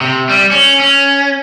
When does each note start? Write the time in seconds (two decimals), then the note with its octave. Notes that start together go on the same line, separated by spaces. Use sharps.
0.01 C3
0.29 G3
0.51 C#4
0.80 C#4